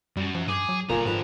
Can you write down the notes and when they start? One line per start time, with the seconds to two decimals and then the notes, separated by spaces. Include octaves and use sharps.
0.17 F#2 G3
0.35 F3
0.48 G2 G#4 D6
0.69 F#3
0.89 F#1 A#2 D3 G#5 A#5
1.05 G#2 F3 B4